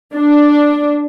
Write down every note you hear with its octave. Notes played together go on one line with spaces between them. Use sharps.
D4